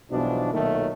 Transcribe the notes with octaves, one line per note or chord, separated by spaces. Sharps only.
B1 G2 B2 E3 F3 D4
B1 A#2 D#3 F#3 A3